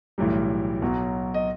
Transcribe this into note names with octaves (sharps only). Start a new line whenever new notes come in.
B1 A2 E3 G3
B1 B2 F#3
D#5